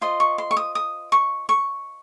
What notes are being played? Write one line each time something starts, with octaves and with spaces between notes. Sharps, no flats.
F4 C5 D#5 C6
C#6
C6
C#6
D#6
D#6
C#6
C#6